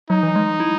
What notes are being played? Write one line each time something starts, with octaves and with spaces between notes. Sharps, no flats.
F#3 D#4
E3
G#3
E4